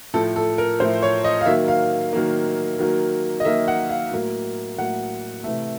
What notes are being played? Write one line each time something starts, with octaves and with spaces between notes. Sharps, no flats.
A2 F3 A3 A4
A4
A#4
A2 F3 A3 C5
C#5
D#5
F5
D#3 F#3 A#3 E5
F5
D#3 F#3 A#3
D#3 F#3 A#3
D#5
D#3 F#3 A#3 E5
F#5
F5
A2 F#3 A#3
A2 F#3 A#3 F#5
C3 E3 A3